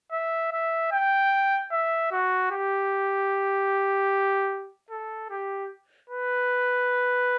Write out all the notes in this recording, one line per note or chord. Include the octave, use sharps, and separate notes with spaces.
E5
E5
G5
E5
F#4
G4
A4
G4
B4